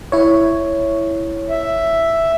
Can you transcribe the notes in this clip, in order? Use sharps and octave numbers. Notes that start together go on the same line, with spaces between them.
E4 C#5
E5